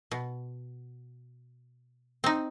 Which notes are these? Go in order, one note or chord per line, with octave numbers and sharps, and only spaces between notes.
B2
C4 D#4